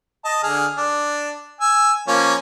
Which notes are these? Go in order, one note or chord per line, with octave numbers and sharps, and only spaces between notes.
D#5 A5
D3 G#4 F6
D4
G#5 E6
F3 A#3 C#4